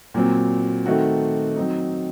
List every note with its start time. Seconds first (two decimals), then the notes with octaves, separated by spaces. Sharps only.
0.14 A#2 F#3 C4
0.86 D#3 A3 C4 F#4
1.56 F#3 C4 D#4